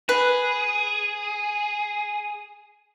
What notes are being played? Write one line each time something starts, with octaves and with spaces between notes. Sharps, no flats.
G#4 B4